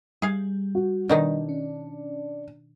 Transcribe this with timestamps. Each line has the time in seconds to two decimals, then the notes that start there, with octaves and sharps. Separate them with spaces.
0.22 G3 G#4 F5
0.75 F#4
1.09 B2 D#3 D4 D#4
1.49 C#4